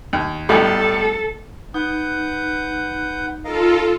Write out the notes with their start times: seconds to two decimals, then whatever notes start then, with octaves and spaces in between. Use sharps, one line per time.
0.13 D#2
0.49 B1 A2 G3 A4
1.74 D#4 B4 F#5 G6
3.44 F4 A4 A#4 D#5 F5